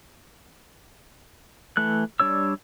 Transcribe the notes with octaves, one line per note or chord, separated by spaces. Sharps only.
E3 A3 F#6
G3 D4 C#5 E6